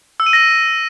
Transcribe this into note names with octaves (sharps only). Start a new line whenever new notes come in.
E6
D#7
A#6